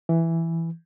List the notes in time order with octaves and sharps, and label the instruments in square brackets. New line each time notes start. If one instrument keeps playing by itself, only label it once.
[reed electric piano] E3